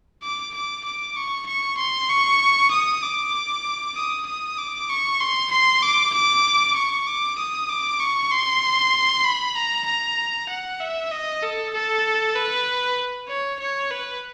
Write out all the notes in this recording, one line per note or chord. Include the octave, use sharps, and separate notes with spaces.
D6
D6
D6
C#6
C#6
C6
C#6
D#6
D6
D#6
D#6
D6
C#6
C6
C6
D6
D6
C#6
D6
D#6
D6
C#6
C6
B5
A#5
A#5
F#5
E5
D#5
A4
A4
B4
C#5
C#5
B4